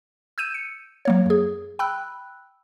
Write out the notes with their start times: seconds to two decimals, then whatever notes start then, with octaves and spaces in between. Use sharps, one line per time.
0.38 E6 G6 D#7 E7
0.54 C#7
1.05 F#3 A#3 C#5
1.26 F#2 G#4
1.79 G5 B5 E6 F#6